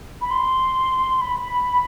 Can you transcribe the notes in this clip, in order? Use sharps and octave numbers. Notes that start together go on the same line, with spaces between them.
B5
C6
B5